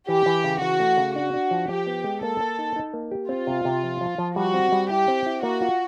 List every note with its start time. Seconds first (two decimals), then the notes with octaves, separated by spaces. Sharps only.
0.08 E3 G4
0.26 E3
0.44 C#3
0.61 E3 F#4
0.80 A3
0.97 C#3
1.16 D4 F#4
1.34 D4
1.51 F3
1.69 F3 G4
1.87 B3
2.04 G#3
2.23 A#3 A4
2.41 A#3
2.59 D#4
2.76 D#4
2.93 A#3
3.11 G4
3.29 C4 F4
3.47 C3
3.65 C3
3.84 F3
4.01 F3
4.18 F3
4.36 G3 F#4
4.54 C4
4.72 G3
4.90 E4 G4
5.08 C4
5.26 E4
5.43 A#3 F#4
5.62 F4